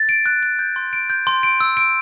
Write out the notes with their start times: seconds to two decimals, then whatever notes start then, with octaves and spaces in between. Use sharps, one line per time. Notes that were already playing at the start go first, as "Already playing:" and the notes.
Already playing: A6
0.09 D7
0.26 F#6
0.43 F#6
0.59 G6
0.76 C6
0.93 D7
1.10 G6
1.27 C6
1.43 D7
1.60 E6
1.77 D7